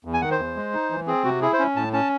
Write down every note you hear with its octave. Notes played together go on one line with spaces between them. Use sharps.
E2
G#5
D#3 F#5
C5
E2
G#3
D#4
E3
C4 G#4
C3 F#4
E4 G#4
C5
C#4
A2 A5
C#4 A5